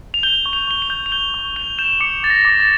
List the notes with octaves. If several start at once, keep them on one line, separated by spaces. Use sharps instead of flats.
F7
G6 G7
C#6
F7
C#6 G7
F7
G6
F7
G6 G7
C#6
G6 F7
G6 E7
D6 C#7
D6 A6
A#6
D6
A6